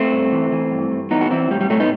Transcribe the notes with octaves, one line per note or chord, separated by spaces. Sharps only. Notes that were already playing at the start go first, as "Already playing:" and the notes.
Already playing: A3 C4
G2
E3
E3
G2
G2
E3 B3 D#4
F#4
E3 C4 E4
A2 G3
G3
A2 F#3 A3
B3 D#4